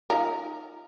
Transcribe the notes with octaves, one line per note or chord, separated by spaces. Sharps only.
D#4 F4 A#4